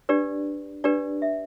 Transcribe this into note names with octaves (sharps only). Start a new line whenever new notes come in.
D4 G4 B4 D5
D4 G4 B4 D5
E5